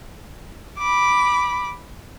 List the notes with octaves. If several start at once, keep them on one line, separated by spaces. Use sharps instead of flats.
B5 D6